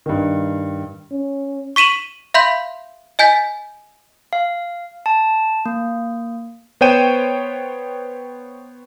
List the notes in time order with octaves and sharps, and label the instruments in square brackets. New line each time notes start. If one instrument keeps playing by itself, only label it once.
[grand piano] G2 D#3
[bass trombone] C#4
[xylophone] C#6 B6 D#7 E7 F#7
E5 F5 B5 C6 G6 B6
D#5 G#5 G6 B6
[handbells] F5
A5
A#3
[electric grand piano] B3 C5 C#5 G5 D#7 E7